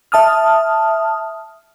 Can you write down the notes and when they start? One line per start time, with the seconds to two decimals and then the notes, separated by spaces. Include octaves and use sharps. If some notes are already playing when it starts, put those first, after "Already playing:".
0.12 E5 A5 D#6 F6